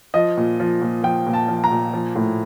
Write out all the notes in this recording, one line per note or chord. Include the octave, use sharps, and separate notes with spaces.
F3 D#5
A#2
F3
A#2
F3 G5
A#2
A5
F3
A#5
A#2
F3
A2